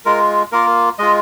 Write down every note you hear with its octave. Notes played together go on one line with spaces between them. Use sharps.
G#3 F4 A#4
A#3 F4 A#4
G#3 F4 D#5